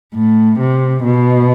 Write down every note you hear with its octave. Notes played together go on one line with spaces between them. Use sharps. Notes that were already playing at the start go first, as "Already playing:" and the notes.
A2
C3
B2